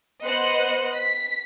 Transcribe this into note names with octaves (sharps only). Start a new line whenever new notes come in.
B3 C5 D#5 F#6 C#7
B6